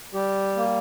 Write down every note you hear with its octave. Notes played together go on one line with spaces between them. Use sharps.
G3 G4
A#3